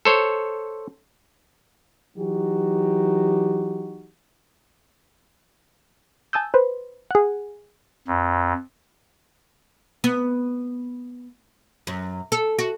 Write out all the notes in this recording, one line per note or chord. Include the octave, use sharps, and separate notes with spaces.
A4 C5 C#5
E3 F#3 D#4 F#4 G4
G#5 A5 D#6 E6 G6
B4 C5
G#4 F#5
F2
B3
F#2
A4
F#4